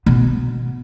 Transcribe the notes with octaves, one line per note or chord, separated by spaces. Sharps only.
B2 B3